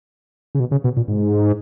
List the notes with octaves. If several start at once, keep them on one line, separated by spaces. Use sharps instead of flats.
C#3
B2
C#3
B2
A#2
G#2